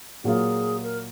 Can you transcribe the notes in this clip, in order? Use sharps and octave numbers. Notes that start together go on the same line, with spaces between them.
A#2 F#3 A#3 F4 G#4
A#4